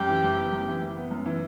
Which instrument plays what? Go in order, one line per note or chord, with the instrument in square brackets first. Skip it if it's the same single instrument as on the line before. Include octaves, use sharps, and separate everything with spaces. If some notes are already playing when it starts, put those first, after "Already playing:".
Already playing: [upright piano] F#2 [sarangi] G4
[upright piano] E3
F#1
B3
F#2
E3
F#1
B3
F#2
E3